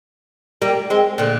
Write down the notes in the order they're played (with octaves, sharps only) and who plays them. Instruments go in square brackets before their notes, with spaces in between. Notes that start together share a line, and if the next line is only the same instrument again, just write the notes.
[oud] G3 A#3
G#3 C4
A#2 D3